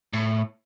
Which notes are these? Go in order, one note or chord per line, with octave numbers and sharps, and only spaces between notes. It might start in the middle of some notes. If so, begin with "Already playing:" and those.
A2